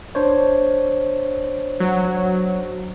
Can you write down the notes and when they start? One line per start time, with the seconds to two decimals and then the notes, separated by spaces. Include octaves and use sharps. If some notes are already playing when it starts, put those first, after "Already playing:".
0.15 D4 C5 C#5
1.80 F#3